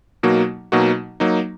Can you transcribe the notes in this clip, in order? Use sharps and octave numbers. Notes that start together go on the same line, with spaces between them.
B2 F#3 A#3 D#4 F#4
B2 F#3 A#3 D#4 F#4
F#3 A#3 D#4